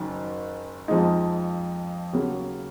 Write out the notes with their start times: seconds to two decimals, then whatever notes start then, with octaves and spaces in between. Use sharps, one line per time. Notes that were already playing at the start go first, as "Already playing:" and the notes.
Already playing: F#1 F#2 D#3
0.88 F2 F3 G#3 D#4
2.13 D#2 C#3 F#3